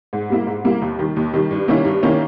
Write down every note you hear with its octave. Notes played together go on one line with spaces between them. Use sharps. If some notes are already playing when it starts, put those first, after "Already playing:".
G#2
G3 A#3 E4
G#2
G3 A#3 E4
D#2
D#3 G3
D#2
D#3 G3
G2
D#3 A#3 C#4 E4
G2
D#3 A#3 C#4 E4